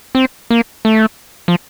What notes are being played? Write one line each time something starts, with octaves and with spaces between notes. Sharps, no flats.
C4
A#3
A3
F3